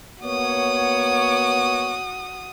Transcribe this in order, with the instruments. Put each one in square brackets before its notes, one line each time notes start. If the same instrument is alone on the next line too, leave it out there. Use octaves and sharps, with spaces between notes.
[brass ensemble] A#3 B3 C#5 [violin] F#4 D#6